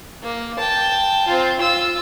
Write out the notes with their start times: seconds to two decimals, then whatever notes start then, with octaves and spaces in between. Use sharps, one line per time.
0.23 A#3
0.58 G5 A5
1.27 C4 F4
1.59 F4 E6